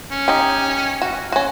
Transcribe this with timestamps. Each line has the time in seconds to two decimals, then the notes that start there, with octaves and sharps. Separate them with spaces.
0.11 C#4
0.28 D#4 G4
1.02 F#4
1.32 C#4 F#4